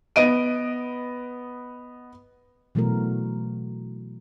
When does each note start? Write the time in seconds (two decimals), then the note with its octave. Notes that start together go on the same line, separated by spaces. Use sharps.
0.16 B3 D#5 D7 D#7
2.75 B2 E3 F#3 A3 F#4 A#4